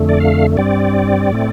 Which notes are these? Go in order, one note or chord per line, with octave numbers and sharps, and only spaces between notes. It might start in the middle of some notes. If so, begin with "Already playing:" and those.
Already playing: F2 D3 A3
D5
F5
G2 G3 C4 D5
A2 A3 C4